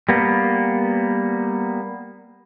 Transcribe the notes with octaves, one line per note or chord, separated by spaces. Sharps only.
G3 A#3 B3